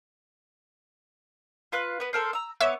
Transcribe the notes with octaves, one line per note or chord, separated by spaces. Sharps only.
F4 B4 F#6
B3 B4
A4 A#4 C5
A#5 E6
B3 C#5 E5 D6